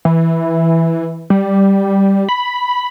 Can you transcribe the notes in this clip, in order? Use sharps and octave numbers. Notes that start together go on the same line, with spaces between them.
E3
G3
B5